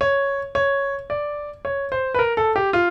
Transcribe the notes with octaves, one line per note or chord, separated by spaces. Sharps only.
C#5
C#5
D5
C#5
C5
B4
A#4
A4
G4
F4